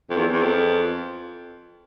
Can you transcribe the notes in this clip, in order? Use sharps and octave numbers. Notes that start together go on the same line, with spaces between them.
F2
E2
E2
F2